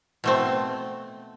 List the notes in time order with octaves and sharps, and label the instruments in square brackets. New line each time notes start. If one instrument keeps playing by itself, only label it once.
[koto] B2 A3 C4